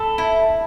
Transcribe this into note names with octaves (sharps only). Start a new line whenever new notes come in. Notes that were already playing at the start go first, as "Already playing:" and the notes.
Already playing: A4 A5 B5
E4